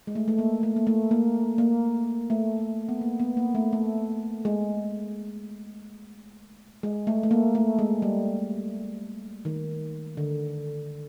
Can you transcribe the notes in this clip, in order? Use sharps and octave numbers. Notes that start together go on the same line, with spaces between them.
G#3
A3
A3
A#3
A3
A#3
A3
A#3
A#3
A3
B3
A#3
B3
A#3
A3
A3
G#3
G#3
A3
A3
A#3
A3
G#3
G3
D#3
D3